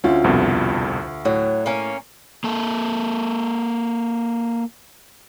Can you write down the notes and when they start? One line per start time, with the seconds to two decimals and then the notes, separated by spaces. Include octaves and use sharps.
0.04 D2 C#4 F4
0.24 C2 F2 B2
1.25 A2 F#3
1.66 A#3 C#4
2.44 A#3 A4